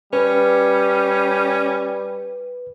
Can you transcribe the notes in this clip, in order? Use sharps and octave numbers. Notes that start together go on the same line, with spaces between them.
G3 C#4 B4